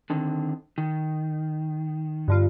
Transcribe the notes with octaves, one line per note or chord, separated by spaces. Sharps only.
D3 D#3 C4
D#3
G2 D3 F4